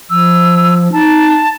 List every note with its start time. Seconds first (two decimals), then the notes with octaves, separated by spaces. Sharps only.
0.10 F3 E6
0.93 D#4 A5